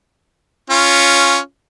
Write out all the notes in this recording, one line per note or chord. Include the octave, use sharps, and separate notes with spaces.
C#4 F4